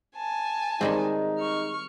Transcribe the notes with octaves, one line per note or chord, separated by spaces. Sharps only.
G#5 A5
D#3 G3 G#3 C4 D#4
C#6 F6